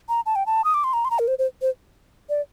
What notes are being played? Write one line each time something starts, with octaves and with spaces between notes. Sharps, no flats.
A#5
A5
G5
A5
D#6
D6
C6
A#5
C6
A#5
A#4
C5
C5
C5
D5